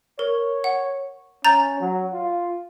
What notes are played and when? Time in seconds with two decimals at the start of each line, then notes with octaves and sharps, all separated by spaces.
0.19 A#4 C#5
0.64 F#5
1.45 C#4 A#5 G6 A6
1.80 F#3
2.13 F4